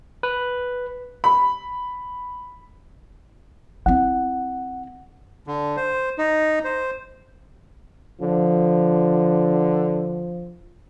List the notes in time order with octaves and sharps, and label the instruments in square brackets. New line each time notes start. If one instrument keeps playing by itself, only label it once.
[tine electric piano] B4
[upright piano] B5
[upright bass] C4 E4 [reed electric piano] F#5
[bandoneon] D3
C5
D#4
C5
[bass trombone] D3 [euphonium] F3